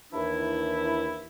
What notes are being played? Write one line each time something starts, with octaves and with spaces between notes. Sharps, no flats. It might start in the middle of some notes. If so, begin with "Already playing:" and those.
D#2 E3 D4 E4